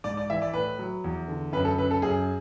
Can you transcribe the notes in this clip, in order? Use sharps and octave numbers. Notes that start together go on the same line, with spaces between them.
G#2 D5
D5
E3 E5
D5
A2 B4
F#3
E2
D3
F#2 B4
A4
C#3 B4
A4
F#2 G#4